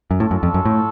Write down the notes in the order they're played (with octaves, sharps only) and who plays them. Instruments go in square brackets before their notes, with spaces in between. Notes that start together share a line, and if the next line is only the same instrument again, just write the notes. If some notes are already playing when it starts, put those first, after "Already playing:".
[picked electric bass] F#2
[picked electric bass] A2 [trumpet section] F4 A4 C#5
[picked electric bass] F#2
F2
F#2
A2